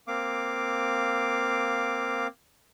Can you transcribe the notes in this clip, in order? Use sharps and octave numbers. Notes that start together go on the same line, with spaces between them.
A#3 C4 F5 D6